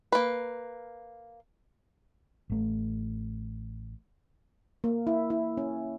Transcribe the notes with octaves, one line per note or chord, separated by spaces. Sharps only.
A#3 B4
A1 A3
A#3
E4
E4
C#4